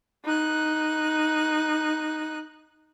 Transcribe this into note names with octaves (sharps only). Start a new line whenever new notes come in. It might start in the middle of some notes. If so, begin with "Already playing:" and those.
D#4 F#6